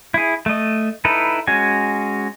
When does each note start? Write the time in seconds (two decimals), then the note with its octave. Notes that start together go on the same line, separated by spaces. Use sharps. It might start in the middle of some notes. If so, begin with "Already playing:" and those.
0.14 E4 G#4
0.46 A3 D#5
1.05 D#4 E4 A4 B4
1.47 G#3 C#4 F#4 G#5